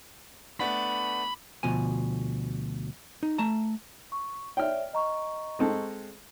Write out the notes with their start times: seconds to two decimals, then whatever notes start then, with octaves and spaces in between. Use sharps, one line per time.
0.60 A3 B3 D4 B5
1.63 D2 B2 F3 G#5
3.23 D#4
3.38 A3 A5 A#5
4.12 C#6
4.57 C#5 D5 E5 G5 F6
4.93 D#5 A#5 C#6
5.59 G#3 C4 A4